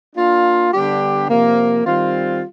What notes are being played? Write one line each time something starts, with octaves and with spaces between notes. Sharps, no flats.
A#3 D4 F4
D3 G3 B3 D4 G4
C3 F3 A#3
D#3 G3 C4 F4